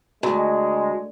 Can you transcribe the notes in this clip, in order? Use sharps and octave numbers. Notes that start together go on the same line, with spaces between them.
D2 G#3